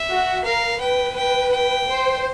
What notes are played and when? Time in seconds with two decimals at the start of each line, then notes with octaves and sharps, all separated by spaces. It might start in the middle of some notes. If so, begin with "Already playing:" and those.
Already playing: E5
0.09 F#4
0.44 A#4 F5
0.80 B4 G5
1.16 G5
1.52 G5
1.88 C5